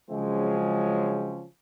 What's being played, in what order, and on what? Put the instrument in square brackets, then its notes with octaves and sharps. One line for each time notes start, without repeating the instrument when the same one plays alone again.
[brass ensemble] C#3 F3 F#3 G#3 C4 C#4